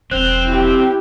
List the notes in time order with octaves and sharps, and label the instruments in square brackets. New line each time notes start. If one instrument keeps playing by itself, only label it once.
[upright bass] E1 F3 [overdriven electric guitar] C4 [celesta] F#6 F7
[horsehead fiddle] E4 G4